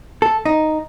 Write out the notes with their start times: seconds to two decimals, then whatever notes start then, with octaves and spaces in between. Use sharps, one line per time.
0.22 A4
0.45 D#4